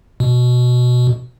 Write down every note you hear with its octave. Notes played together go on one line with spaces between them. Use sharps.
B2